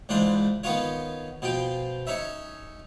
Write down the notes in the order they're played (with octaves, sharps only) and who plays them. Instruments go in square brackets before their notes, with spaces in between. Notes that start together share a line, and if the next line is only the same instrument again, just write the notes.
[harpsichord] C#2 G#2 E3 D4 C5
D#3 B3 C#4 F4 C#5
B2 F3 F4 G5
C#4 D#4 C#5 E5